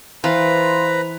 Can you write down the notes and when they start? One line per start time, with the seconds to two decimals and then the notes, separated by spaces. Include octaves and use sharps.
0.24 E3 F4 B4 C5 A#5